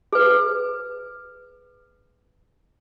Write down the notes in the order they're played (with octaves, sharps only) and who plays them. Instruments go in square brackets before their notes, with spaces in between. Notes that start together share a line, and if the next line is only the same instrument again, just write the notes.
[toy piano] G#4 B4